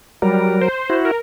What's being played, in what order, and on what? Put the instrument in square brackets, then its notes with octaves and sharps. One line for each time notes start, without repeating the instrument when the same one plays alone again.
[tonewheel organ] F#3 A#4 [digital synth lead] G3
[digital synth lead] C5
[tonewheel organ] E4 F#4
[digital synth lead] A#4